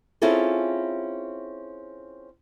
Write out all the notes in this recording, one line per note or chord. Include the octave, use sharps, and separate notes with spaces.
C4 C#4 E4 F4 G#4 A4